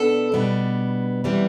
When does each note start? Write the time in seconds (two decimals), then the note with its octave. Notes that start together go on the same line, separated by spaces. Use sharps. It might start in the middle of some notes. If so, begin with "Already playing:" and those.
Already playing: B2 B3 D4 A4
0.32 B2 G3 B3 D4
1.24 C3 E3 G3 B3